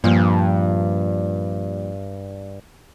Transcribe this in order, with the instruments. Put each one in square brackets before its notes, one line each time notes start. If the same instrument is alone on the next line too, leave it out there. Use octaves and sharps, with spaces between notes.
[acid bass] G2 [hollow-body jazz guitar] A#2 F3